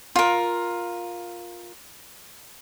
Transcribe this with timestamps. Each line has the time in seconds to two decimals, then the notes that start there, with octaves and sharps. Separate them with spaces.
0.16 F4 A#4